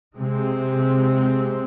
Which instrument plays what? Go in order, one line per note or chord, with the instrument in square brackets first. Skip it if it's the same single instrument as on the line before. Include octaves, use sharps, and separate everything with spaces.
[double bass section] C3 G#3 C4